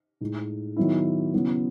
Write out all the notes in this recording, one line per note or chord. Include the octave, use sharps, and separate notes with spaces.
A2 G#3 D#4
D#3 F#3 B3 E4
C#3 F#3 B3 E4